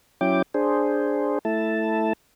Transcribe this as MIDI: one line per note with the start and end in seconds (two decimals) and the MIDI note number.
0.21 0.42 54
0.21 0.42 61
0.21 0.42 64
0.21 0.42 79
0.21 0.42 86
0.54 1.39 62
0.54 1.39 68
0.54 1.39 72
1.45 2.13 57
1.45 2.13 64
1.45 2.13 81